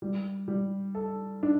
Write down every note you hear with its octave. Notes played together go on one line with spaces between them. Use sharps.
G3
G3
A4
D4